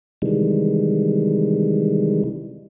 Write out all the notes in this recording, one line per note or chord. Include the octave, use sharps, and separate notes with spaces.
C3 D#3 E3 G3 G#3